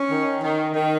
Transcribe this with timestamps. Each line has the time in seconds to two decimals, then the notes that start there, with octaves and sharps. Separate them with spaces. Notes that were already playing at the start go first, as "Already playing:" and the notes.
Already playing: C#4
0.10 D#3
0.43 D#3
0.74 D#3